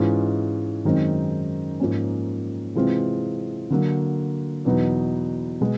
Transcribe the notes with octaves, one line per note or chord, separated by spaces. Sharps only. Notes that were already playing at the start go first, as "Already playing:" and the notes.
Already playing: G#2 E3 G#3 C#4 F4
F#2 D#3 G#3 C4 D#4
G#2 F3 A#3 C#4
C3 E3 G#3 C4 F4
D3 F#3 A#3
E2 B2 F#3 B3 D#4
B2 G#3